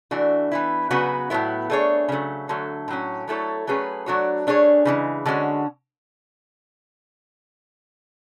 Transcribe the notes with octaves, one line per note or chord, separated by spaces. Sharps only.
E3 A3 D4 F#4
E3 B3 E4
C#3 F#3 B3 F#4 B4
A2 F#3 B3 E4
A3 D4 G#4 C#5
C#3 F#3 A3
D3 F#3 A3
A2 F#3 C#4
F#3 A3 E4 A4 C#5
F#3 A3 C#4 G#4 B4
F#3 A3 D4 F#4 C#5
A3 D4 G#4 C#5
C#3 E3 G#3
D3 G#3 C#4 F#4